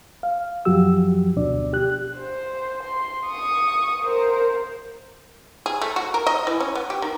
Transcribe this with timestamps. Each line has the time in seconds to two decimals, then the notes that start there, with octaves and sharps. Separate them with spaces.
0.23 F5
0.65 F#2 F3 F#3 F#4 G4 E6
1.36 D2 B2 D4 D5
1.73 G4 F#6
2.16 C5
2.83 C6
3.27 C#6 D#6
4.03 A#4 C5
5.66 G#4
5.82 A3
5.96 F#4
6.14 A#4
6.27 D#5
6.47 E3
6.60 C#4
6.75 B3
6.90 G4
7.02 D#3